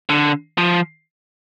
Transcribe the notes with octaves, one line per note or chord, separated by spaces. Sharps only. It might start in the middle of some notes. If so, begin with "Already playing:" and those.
D3
F3